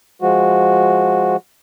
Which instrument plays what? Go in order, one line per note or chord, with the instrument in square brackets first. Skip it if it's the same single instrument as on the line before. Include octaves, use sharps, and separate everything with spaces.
[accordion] F3 G#3 F#4